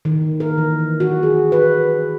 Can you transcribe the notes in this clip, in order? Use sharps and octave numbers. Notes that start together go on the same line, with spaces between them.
D#3
A#4
E3
F#4
G#4
B4